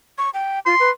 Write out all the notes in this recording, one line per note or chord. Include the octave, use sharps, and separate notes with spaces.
C#6
G5
F4 C6
B4